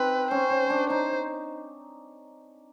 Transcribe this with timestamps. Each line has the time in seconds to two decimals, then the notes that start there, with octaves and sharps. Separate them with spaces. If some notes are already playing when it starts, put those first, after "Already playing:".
Already playing: C4 D#4 B4
0.31 C#4 C5
0.50 C#4
0.70 D4
0.90 D#4 C5